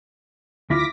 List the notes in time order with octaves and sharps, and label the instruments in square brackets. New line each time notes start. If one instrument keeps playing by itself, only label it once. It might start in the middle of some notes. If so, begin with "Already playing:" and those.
[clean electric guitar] D2 E4 F4 [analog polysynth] D6 A#6 B6